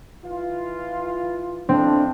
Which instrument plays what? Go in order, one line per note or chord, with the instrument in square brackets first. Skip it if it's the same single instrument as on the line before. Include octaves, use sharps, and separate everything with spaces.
[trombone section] E3 F4
[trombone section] F2 A2 F3 [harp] C4 [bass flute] D4